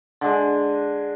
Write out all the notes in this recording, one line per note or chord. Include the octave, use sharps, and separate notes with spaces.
D3 G#3